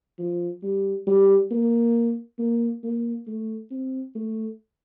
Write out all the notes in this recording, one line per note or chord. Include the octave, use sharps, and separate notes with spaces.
F3
G3
G3
A#3
A#3
A#3
A3
C4
A3